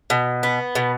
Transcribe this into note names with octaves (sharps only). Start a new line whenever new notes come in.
B2
B3
B2